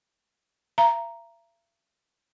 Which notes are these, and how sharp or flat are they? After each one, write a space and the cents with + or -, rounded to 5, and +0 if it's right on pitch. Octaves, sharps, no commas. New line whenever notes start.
E5 +45 A#5 +0